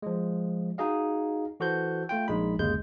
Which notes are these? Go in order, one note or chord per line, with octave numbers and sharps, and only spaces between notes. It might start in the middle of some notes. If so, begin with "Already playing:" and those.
F3 G#3
D#4 F#4 G#4 D#5 F5
E3 F#4 A4 C5 G6
A3 F4 G5
A#1 G#3 D#4 B5
G1 D#2 C#3 G#3 G6